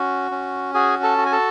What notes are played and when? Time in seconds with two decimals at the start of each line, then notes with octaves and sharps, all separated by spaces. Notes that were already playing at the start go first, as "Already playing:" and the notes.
Already playing: C#4 F#4
0.31 C#4
0.74 F#4 G#4 G#5
1.03 A4 A5
1.18 F#4
1.26 G#5
1.32 A4 A5